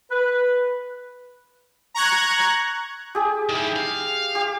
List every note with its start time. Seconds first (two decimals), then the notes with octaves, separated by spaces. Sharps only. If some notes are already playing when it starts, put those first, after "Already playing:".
0.11 B4
1.94 A#5 C#6 F#6 G#6
3.15 G4 G#4
3.49 D#3 E4
3.76 F5
4.35 G4